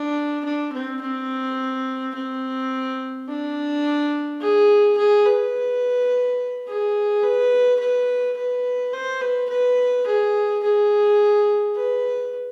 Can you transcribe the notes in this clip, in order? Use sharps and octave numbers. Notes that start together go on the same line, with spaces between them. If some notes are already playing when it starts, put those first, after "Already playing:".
Already playing: D4
D4
C4
C4
C4
D4
G#4
G#4
B4
G#4
B4
B4
B4
C5
B4
B4
G#4
G#4
B4